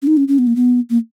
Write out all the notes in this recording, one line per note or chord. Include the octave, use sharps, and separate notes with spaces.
C#4
D#4
C#4
C#4
B3
A#3
B3
A#3